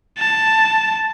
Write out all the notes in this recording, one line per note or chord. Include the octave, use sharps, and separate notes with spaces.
A5